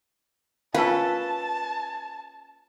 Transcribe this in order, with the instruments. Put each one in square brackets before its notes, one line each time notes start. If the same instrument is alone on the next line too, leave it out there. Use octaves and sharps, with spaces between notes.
[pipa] A#3 C#4 A4 [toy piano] F4 F5 [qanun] B4 [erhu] A5